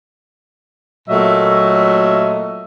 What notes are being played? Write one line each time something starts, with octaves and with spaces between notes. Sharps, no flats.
A#2 F#3 A3 D#5 E5